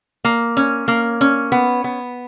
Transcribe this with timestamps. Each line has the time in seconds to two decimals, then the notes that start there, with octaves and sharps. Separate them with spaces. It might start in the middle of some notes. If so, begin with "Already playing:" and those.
0.24 A#3
0.57 C#4
0.88 A#3
1.21 C#4
1.52 B3
1.84 B3